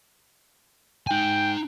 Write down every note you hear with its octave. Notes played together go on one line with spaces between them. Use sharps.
D#4 G5 G#5